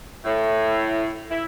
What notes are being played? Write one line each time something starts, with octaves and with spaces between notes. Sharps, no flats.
A2
E4